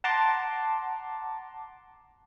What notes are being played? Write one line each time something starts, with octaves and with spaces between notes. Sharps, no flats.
F#5 A5 A#5 C6 D6